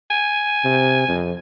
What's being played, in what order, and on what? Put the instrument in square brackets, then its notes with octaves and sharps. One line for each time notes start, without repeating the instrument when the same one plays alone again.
[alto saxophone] G#5
[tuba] C3
F2